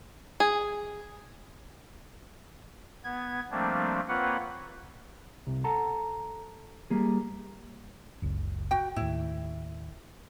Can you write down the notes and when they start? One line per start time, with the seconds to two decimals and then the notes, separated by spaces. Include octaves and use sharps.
0.40 G#4
3.04 B3 G#6
3.51 F3 G3 A3 A#3 C4 D4
4.08 A#3 C4 F4 B4 C#5 F#5
5.47 C2
5.64 A4 F#5 A5 A#5
6.90 G3 A#3 G#4
8.22 F#1 C#2
8.71 F#4 G5
8.96 D#2 A2 E4